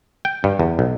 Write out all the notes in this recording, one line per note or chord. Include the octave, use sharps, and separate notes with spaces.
G5
G2
E2
B1